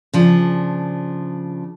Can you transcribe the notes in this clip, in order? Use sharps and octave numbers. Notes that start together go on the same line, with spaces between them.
C#3 F3 D4